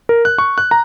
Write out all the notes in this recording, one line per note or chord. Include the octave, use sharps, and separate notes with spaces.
A#4
F#6
C#6
F#6
A#5